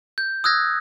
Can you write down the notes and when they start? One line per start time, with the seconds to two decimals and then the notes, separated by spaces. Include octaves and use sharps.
0.18 G6
0.44 D#6 E6 F#6 G#6 A#6